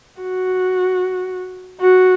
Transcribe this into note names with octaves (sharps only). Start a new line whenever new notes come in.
F#4
F#4